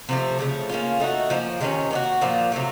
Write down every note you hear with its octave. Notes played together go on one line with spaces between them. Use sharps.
C3 F3 A3
C#3 F3 A3
A#3 C#4 F4
A3 D#4 F#4
F3 A#3 C#4
C3 D#3 A3 C#4
A#3 D#4 F#4
A#2 F3 A#3
C3 F#3 A3